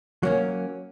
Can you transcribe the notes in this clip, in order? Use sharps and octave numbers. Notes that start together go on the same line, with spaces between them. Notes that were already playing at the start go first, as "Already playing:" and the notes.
F#3 A#3 C#4